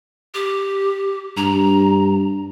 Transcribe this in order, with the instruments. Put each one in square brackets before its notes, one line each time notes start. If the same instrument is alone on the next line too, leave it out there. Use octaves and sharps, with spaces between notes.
[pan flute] G4
[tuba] G2 [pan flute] A#5